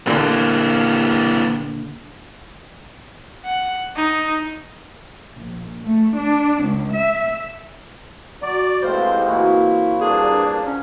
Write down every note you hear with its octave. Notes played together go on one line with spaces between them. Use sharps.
A#2 D3 E3 A#3
F#5
D#4
A#1
A3
D4
C#2
E5
F#3 D5
A2 C3 G#3 C4 F4 B4 C5
A#2 E3 F#3 E4
G2 A#3 D4 G#4
C#4 A#5